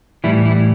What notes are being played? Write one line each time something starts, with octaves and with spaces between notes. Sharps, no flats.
A2 E3 G3 E4
E4